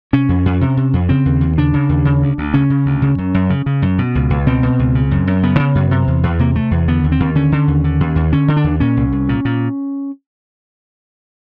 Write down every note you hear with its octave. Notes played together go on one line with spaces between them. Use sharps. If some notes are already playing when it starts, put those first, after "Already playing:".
C3 C#4
F2
F2
C3
C3
F2
C#3 C4
D#2
D#2
C#3 D4
C#3
D#2
C#3
D2
D2
C#3 C#4
C#3
D2
C#3
F#2
F#2
C#3
C#3
F#2
B2
C#2
C#2
B2 C4
B2
C#2
C#3
F#2
F#2
C#3 B3
C#3
F#2
C3
E2
E2
C3 A#3
C3 A3
E2
D3 B3
D#2
C4
D#2
D3 C#4
D3
D#2
D3
D#2
D#2
D3 C#4
D3
D4
D#2
A#2 C#4
C2
C2
A#2
A#2